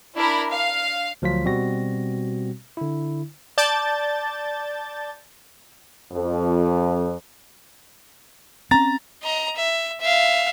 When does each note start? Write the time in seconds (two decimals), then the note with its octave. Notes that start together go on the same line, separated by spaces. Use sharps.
0.16 D4 E4 A#4 B5
0.50 F5
1.22 D2 F3 F#3 F4 B6
1.45 B2 G3 C4 F#4 A#6
2.77 D3 E4
3.58 D5 A5 G6 A6
6.12 F2
8.71 C4 C#4 A#5 A6
9.23 D#5 A#5
9.56 E5
10.01 E5 F5